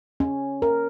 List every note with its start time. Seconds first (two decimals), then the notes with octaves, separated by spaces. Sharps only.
0.20 C#4
0.62 A#4